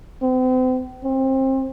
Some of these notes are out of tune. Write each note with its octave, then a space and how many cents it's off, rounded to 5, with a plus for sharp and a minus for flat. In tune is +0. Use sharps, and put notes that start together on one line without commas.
C4 -40
C4 +25